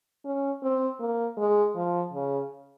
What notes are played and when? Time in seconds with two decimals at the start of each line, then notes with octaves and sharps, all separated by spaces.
0.25 C#4
0.63 C4
1.00 A#3
1.37 G#3
1.76 F3
2.13 C#3